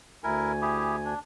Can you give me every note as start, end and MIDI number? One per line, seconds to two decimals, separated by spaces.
0.24 1.14 38
0.24 0.52 64
0.24 0.52 70
0.24 1.14 80
0.62 0.96 64
0.62 0.96 67
0.62 0.96 68
1.05 1.19 62